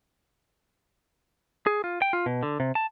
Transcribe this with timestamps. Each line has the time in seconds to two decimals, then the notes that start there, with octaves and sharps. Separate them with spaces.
1.67 G#4
1.84 F4
2.02 G5
2.13 F4
2.26 B2
2.43 D3
2.60 C3
2.75 A5